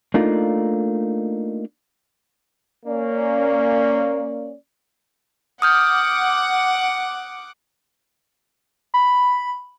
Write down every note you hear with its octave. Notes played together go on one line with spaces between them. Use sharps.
A3 A#3 D4 D#4 F4
A#3 C#4 D5
F#5 D6 D#6 F6 G6
B5